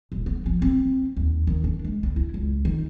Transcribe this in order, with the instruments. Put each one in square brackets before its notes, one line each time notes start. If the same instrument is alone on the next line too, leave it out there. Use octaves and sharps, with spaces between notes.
[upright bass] D#1
B3
F3
C4
D#2
D#3
D4
G#3
D2
E4
C#2
D#3